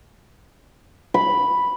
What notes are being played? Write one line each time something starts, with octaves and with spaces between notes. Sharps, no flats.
B5